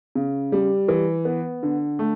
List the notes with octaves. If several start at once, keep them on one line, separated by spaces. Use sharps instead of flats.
C#3
G3
E3
B3
D3
A3